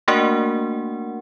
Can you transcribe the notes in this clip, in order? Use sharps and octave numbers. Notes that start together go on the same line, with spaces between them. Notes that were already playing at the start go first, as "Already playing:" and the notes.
A3 A#3 D4 F#4 A#4 F#5